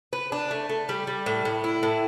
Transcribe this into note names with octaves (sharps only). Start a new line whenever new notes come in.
B4
D4
A3
A3
G3
G3
A2
A2
E4
A2